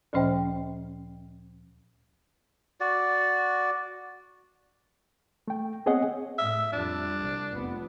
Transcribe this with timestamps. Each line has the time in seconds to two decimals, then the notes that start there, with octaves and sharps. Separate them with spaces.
0.13 D2 A#2 F3 C#4 C5 G5
2.80 F#4 D5
5.48 A3 G5
5.86 B3 C4 G#4 C#5 D#5 F#5
6.38 A2 E5
6.72 F2 G3 D4
7.20 C2
7.53 F1 F2 B3